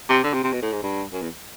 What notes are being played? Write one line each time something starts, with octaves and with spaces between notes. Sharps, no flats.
C3
D3
C3
C3
B2
A2
G#2
G2
F#2
E2